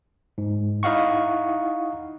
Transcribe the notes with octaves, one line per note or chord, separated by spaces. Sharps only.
G#2
D#4 E4 D#5 F5 F#5 C#6